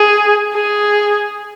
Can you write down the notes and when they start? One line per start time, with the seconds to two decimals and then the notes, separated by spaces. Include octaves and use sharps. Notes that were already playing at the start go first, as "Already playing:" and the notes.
Already playing: G#4
0.55 G#4